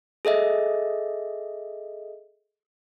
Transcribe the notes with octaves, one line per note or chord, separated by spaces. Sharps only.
G#4 A4 D#5 E5